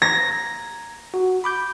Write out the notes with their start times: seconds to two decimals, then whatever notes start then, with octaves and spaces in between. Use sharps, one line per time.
0.02 A#5 G#6 A#6
1.14 F#4
1.44 B5 D6 G6